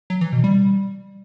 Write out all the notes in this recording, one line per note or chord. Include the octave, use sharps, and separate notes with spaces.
F#3
E3
B2
G3